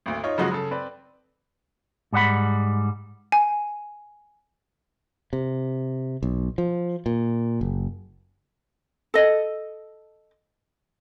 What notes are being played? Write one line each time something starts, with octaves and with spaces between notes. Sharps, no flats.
G#1 D2
D#4 F4 C#5
C#3 F3 F#3 G#3 F#4
C#3 A4
C4 B4 D5
G#2 G3 F#5 B5
G#5
C3
B1
F3
A#2
F#1
A4 D#5